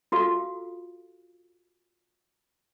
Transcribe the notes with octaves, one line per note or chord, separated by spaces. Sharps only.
F4 F#4 A4 F5